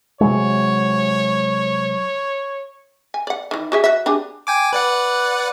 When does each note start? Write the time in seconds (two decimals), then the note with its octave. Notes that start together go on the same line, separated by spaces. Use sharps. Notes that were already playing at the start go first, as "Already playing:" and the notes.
0.21 C3 F#3 G#3 C#5
3.14 G#5
3.27 D5 F#5
3.51 D#3 E3
3.72 F#4 G#4 E5
3.84 F#4 E5
4.06 D4 G4 G#4
4.47 G5 G#5 D6
4.73 B4 D5 F#5